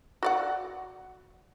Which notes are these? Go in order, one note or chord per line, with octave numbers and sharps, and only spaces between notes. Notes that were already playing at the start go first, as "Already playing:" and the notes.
F#4 D5 F#5